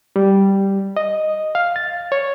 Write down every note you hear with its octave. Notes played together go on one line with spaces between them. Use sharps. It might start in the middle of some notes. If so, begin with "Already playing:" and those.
G3
D#5
F5
A6
C#5